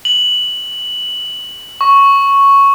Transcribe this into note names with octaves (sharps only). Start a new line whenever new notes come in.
F#7
C#6